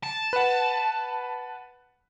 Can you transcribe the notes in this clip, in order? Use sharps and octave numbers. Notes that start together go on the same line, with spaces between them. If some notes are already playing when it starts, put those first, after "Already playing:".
A5
B4 F#5